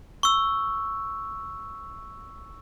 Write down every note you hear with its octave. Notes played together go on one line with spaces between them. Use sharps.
C#6 E6